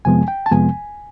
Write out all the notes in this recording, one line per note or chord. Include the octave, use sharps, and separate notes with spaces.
F2 C3 F3 G#3 B3 G#5
G5
A5
F2 C3 F3 G#3 B3 G#5